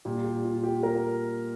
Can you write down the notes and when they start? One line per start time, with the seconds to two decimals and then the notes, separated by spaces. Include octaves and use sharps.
0.05 A#2 G3 G4
0.24 G4
0.44 F4
0.64 G4
0.83 A#4